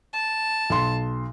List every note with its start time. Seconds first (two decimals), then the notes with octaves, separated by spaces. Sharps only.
0.13 A5
0.70 B1 C6